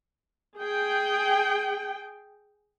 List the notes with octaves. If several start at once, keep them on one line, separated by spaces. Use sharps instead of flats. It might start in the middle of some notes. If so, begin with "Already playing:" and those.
G#4 G5